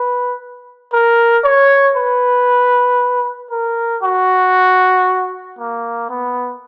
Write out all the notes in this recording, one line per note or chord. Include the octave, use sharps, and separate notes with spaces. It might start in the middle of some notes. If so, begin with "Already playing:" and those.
Already playing: B4
A#4
C#5
B4
A#4
F#4
A#3
B3